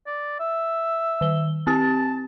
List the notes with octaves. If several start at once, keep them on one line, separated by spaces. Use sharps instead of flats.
D5
E5
D#3 G7
C4 G4 A5 A6